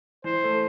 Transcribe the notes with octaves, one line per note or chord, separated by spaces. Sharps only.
E3 C5
A3